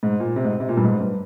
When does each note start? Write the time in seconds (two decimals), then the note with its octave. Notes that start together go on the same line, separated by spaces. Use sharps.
0.03 G#2
0.20 A#2
0.36 C3
0.44 G#2
0.60 C3
0.69 A#2
0.77 G2
0.84 G#2
1.00 G2